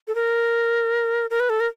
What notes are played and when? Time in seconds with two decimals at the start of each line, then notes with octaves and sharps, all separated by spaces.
0.07 A4
0.15 A#4
1.30 A#4
1.40 B4
1.49 A4
1.60 A#4